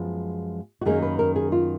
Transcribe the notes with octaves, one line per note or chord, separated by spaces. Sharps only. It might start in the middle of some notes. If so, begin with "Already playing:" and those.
Already playing: F#2 F3 G#3 B3
F#4
F#2 D#3 A#3 C#4 G#4
B4
A#4
G#4
F4